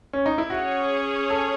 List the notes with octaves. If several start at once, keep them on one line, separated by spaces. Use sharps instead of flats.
C#4
D#4
E4
C#4 F#4 G#4 C#5
A4